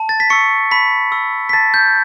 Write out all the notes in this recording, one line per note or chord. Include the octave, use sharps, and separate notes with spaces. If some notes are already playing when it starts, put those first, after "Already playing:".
Already playing: A5
A6
B6
C#6 E6 C#7
A5 B5 B6
C#6 E6
B6
A5 A6
G6